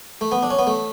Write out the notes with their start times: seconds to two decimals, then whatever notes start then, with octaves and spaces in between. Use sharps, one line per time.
0.21 A3
0.32 B3
0.43 D4
0.50 C#4
0.59 B3
0.67 A3